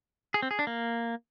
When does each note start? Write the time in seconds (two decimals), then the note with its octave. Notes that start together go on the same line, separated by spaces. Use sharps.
0.34 G#4
0.42 C4
0.51 G#4
0.59 D4
0.67 A#3